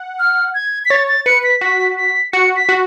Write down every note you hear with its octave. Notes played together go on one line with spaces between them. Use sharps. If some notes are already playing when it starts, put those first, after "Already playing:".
Already playing: F#5
F6
G#6
B6
C#5 A6
A6
B4 C#7
B6
F#4 B6
B6
F#4 C#7
B6
F#4